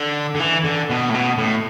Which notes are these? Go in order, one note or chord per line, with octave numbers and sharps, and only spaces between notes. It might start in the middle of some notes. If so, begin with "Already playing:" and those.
Already playing: D3
D3
E3
D3
B2
A2
B2
A2